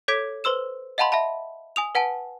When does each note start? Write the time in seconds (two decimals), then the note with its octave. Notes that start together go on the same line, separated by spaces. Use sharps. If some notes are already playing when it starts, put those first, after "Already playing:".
0.08 A4 C#5 D6 G#6 B6 D7
0.44 B4 C5 C6 E6 E7
0.98 D#5 F5 F#5 A5 B5 C6
1.12 E5 F5 A5 B5
1.76 G#5 D#6 F7
1.95 B4 F#5 G#5 A5